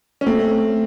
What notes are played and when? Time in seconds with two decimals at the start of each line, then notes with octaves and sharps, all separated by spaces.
0.21 C#4
0.26 A3 C4